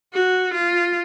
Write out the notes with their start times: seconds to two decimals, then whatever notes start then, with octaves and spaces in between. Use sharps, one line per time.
0.13 F#4
0.54 F4